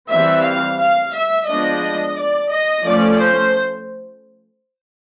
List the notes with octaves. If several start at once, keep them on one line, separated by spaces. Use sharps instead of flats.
E3 G3 C4 E5
F5
F5
E5
F3 G#3 B3 D4 D#5
D5
D#5
F3 A3 C#4 D5
C5